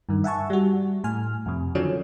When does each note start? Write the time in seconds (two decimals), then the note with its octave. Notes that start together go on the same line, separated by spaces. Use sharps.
0.09 G2 D#3
0.24 E5 F#5 G#5 A5 C#6
0.50 G3 F#4
1.04 A2 G#5 F6
1.46 F2 C3
1.75 D3 D#3 F3 F#3 C#4 D4